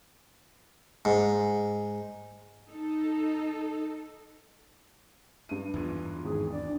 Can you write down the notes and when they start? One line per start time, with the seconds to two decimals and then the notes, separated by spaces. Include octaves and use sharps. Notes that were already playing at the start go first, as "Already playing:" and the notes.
1.05 G#2
2.68 D#4 A4
5.49 G2 D#7
5.74 E2 G#2 E3 F4
6.25 G#1 G#4
6.52 D4 D5